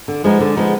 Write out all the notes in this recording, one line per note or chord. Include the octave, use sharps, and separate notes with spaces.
D3
F3 G#3 B3 D#4
D3
F3 G#3 B3 D#4